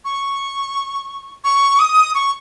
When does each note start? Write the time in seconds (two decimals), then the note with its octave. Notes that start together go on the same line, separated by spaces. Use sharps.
0.05 C#6
1.44 C#6
1.79 D#6
2.15 C#6